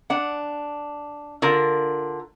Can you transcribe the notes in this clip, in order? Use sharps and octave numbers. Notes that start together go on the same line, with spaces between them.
D4 F#5
D3 F4 A#4